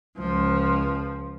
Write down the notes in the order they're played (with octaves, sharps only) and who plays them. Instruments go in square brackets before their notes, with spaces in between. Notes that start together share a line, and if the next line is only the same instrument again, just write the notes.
[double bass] C#2 F3